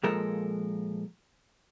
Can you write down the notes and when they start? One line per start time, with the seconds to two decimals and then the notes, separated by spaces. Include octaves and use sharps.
0.03 A#2 F3 G#3 A4 A#4